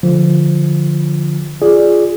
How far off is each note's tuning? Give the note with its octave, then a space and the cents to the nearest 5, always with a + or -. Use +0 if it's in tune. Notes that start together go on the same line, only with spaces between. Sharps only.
D3 +0 F3 +0
F4 +0 G#4 +0 D5 +0